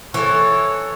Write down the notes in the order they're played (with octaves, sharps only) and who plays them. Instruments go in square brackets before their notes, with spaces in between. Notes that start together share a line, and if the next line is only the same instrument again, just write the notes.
[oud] E3 [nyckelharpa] A4 [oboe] C#5